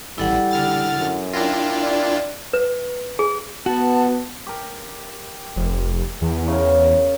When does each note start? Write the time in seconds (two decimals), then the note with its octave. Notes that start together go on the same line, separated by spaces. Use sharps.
0.18 A1 E3 G3 E4 A4 F#5
0.51 D3 F6 A6
0.97 F#2
1.33 D4 E4 F4 A#4 G5
1.83 D5
2.53 B4
3.19 G#4
3.66 B3 F#4 A5
4.47 G4 A#4
5.56 F1
6.21 E2
6.48 C#3 A#4